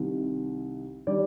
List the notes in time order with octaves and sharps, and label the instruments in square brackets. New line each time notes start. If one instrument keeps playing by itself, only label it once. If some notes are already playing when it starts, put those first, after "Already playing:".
Already playing: [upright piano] C2 C3 D#3
D#3 G3 D4 G4 D5